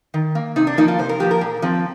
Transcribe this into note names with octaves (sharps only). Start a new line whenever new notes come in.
D#3
A#3
C3 D#4
D4
F3 A#3 D#4
F4
C3 C5
A#4
F3 A#3 G4
A#4
A#2
F3 C4